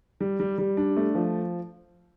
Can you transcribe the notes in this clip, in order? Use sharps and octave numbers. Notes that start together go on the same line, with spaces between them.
G3
G3
G3
D4
A3
F3